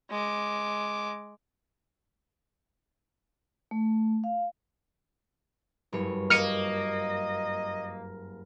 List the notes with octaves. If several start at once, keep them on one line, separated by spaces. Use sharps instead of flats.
G#3 D6
A3
F5
F#1 G2 C#5
A#3 D#5 F6 C#7 D#7